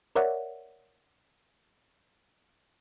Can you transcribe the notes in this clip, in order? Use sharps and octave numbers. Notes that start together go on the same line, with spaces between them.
A#4 C#5 D5 E5 F#5